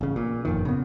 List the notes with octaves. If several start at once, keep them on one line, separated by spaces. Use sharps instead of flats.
A1 C#3
A#2
G1 F2 A#2 D#3
C#3 B3